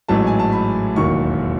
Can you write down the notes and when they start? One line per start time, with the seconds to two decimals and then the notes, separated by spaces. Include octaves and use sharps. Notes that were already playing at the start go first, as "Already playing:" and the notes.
0.08 A1 G#2 F#3 A3 A5
0.27 G#5
0.39 A5
0.52 B5
0.96 E1 D#2 D#3 F#3 C#6